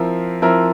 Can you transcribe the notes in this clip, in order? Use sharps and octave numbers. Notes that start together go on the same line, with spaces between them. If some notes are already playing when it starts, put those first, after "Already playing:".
Already playing: F3 C4 E4 A#4
F3 C4 E4 A#4